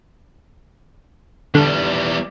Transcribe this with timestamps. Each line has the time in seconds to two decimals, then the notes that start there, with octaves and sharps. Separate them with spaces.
1.55 E2 D3 G3